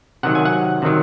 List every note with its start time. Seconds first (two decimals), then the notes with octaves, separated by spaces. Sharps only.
0.23 C3 D#3 F#3 F#5
0.35 G#5
0.45 F#5
0.82 C3 D#3 F#3